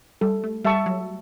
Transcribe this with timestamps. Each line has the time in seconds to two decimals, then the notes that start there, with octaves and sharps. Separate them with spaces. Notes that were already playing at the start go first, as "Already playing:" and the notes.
0.21 G3 A4
0.44 A3
0.64 G3 E5 A5 C#6
0.86 F#3